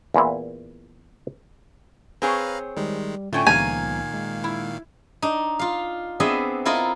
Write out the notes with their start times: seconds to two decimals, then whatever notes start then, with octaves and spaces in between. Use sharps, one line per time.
0.14 E2 A#2 E4
2.22 C4 G#4 B4 C#5 F5 A#5
2.77 D#3 G3 G#3
3.33 A2 D3 A3 C#4 D4 F4 G5 G#5
3.47 C#2 A#2 D#3 F3 B3 F5 G#5 A#5
4.14 G#3
4.44 E4
5.22 D4 D#4
5.59 F4 F5
6.20 B3 C4 D4 G#4 D#5 E5
6.65 E4 F4 A4 A#4 D#5